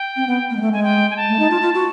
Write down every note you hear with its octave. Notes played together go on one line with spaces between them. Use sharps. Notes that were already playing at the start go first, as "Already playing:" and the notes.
Already playing: G5
C4
B3
A#3
G#3
A3
G#3 G#5
G5
G#5
A5
A3
D#4
F4
F4
F#4